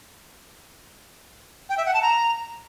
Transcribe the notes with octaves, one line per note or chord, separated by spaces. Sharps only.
G5
E5
F#5
A5
A#5